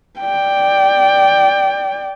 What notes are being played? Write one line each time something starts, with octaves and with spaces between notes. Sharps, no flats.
D5 G5